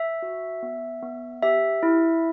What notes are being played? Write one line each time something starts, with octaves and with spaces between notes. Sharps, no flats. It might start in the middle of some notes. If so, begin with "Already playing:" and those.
Already playing: E5
F#4
B3
B3
G4 E5
E4